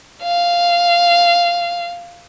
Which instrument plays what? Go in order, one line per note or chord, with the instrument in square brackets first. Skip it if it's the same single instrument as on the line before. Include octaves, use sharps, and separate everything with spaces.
[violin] F5